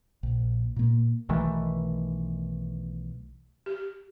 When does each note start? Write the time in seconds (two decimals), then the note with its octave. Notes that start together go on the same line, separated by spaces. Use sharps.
0.23 A#1
0.76 A#2 A#3
1.29 B1 D#3 E3 A3
3.66 G4